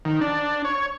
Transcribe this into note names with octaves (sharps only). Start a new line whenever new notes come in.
D#3
D4
C#5